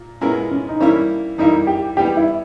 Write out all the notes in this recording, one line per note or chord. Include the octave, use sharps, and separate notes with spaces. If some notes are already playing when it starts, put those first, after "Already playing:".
Already playing: A#2
A#2 G#3 B3 C#4 E4 A#4
C#4
D#4
E3 G3 A#3 C#4 E4
E3 G3 A#3 D#4 E4
G4
E3 G3 B3 G4
E4